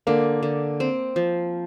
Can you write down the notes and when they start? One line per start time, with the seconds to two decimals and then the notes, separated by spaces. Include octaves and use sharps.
0.07 D3 A#3
0.43 D3
0.80 C4
1.16 F3